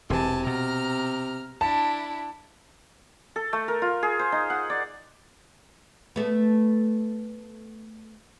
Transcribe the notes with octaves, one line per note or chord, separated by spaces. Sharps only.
E1 C3 E3 G#5 A5
B2 A#5 F6
D4 E4 A5
A4
A3
A#4
F4
G#4
C5
D#4
F#5
D5
A3 B3